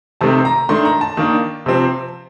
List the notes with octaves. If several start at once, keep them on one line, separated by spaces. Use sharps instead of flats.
C3 D#3 A3 C4 A5
A#5
D#3 A3 D4 C6
A#5
A5
D#3 A#3 D4
C3 F3 C4